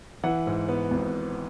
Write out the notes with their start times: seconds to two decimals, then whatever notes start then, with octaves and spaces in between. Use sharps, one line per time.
0.24 E3 F#5
0.47 G#2
0.69 B3
0.91 G#1